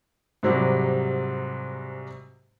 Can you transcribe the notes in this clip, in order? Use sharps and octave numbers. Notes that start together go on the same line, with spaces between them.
G#2 C3 F#3 G3